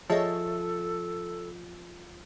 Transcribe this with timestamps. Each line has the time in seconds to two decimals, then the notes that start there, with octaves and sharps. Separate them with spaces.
0.10 F3 G#4 A4 C#5 D#5 E5 A5